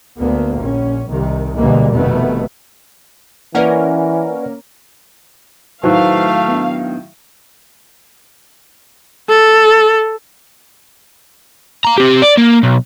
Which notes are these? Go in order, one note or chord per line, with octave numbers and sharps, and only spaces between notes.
D2 A#3 B3
A#1 C#4
C2 C3 D#3
D2 B2 E3 G3 G#3 A#3
F1 B2 D#3 A3 B3
E3 A#3 C#4 A#4 B4 D5 F#5
A2 D#3 F#3 A3 B4 C5 F5 F#6
B3 D4
A4
F5 A#5
C4 G4
D5
A#3
B1